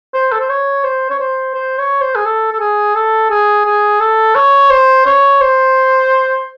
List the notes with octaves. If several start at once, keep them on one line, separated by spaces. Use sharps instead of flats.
C5
A4
C5
C#5
C5
C#5
C5
C5
C#5
C5
G#4
A4
A4
G#4
A4
G#4
G#4
A4
C#5
C5
C#5
C5